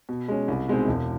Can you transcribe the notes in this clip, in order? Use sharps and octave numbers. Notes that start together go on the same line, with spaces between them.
B2
G#3 C#4
C2
B2 G#3 C4 D#4
E1